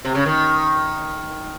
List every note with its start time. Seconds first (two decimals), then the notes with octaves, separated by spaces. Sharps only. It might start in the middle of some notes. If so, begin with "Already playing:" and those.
0.05 C3
0.15 C#3
0.26 D#3